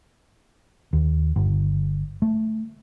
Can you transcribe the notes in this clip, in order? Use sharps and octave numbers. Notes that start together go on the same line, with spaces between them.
D#2
G1
A3